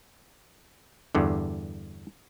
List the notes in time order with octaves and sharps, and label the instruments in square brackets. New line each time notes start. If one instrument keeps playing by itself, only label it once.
[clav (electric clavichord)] E2 G2 D3